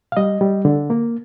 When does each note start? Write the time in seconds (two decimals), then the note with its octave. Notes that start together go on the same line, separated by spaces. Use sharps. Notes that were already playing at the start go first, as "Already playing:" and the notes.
0.12 F5
0.17 G3 D#5
0.41 G3
0.65 D3
0.90 A#3